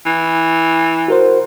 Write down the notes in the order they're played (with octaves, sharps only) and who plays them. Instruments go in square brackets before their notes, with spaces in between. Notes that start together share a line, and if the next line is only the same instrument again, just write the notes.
[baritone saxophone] E3
[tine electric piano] F#4 A#4 C5